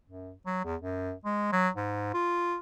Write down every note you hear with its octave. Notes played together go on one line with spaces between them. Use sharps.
F#2
F#3
E2
F#2
G#3
F#3
G#2
F4